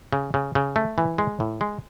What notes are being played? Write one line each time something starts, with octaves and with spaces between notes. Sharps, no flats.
C#3
C#3
C#3
A3
E3
G#3
A2
G#3